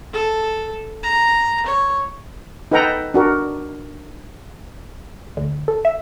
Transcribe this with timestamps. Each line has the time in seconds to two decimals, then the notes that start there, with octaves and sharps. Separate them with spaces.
0.13 A4
1.03 A#5
1.66 C#5
2.71 D#4 A4 B4 F#5 G5 A#5
3.14 D4 F#4 A#4
5.37 D2
5.68 A4
5.85 E5